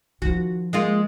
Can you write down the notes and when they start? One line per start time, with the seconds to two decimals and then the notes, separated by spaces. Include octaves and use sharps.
0.22 D#3 F3 F#4
0.73 G#3 A#3 F4